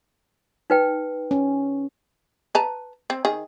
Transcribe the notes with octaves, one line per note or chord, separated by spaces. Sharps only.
D#4 B4 G5
C#4
B4 A5 A#5
C4
D#3 G#4